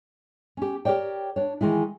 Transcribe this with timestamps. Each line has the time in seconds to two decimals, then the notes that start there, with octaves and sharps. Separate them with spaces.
0.57 C#4 G4
0.85 G4 A#4 C#5 D5 G5
1.36 D4 C#5
1.61 D#3 E3 G#3 E4